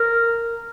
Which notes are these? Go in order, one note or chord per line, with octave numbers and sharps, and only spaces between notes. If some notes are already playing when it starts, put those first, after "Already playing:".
Already playing: A#4